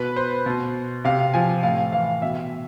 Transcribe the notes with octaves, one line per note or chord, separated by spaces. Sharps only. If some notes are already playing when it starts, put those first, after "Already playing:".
Already playing: B2 B4
C5
B2
C3 F5
F3 G#5
A2 F5
E3 F5
B2 E5